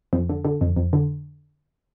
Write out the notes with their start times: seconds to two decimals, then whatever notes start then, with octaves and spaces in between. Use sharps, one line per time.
0.13 F2
0.29 D3
0.45 D3
0.61 F2
0.76 F2
0.93 D3